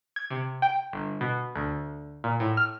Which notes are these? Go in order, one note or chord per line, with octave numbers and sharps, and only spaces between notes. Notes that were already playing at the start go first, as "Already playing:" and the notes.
G#6
C3
G5
G1
B2
D2
A#2
A2
F6